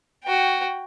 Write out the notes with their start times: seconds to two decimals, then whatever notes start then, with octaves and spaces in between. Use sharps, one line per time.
0.23 F#4 G5